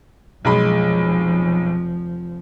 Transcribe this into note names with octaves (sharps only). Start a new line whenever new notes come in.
F1 B1 F3 G#3 B5